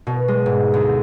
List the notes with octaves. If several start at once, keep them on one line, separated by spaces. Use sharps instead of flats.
B2
G#3
G#2
D2